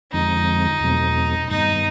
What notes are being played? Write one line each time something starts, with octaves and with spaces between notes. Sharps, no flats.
F2 D3 F3 G#3 C4 D#4
E2 B2 F#3 A3 C4
G2 D#3 G3 B3 D#4